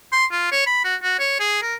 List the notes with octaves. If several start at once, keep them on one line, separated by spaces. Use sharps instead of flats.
C6
F4
C#5
B5
F#4
F#4
C#5
G#4
A#4